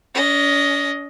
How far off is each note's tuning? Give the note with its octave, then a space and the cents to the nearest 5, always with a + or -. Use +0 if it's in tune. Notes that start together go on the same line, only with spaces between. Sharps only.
C#4 +45 D#5 +0